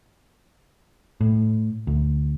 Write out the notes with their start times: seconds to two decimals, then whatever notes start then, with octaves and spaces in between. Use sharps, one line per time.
1.21 A2
1.87 D2